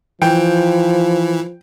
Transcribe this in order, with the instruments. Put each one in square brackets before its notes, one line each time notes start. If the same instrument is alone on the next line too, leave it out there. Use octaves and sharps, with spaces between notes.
[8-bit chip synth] E3 [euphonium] F3 [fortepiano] G5